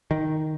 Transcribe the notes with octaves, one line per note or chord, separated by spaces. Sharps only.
D#3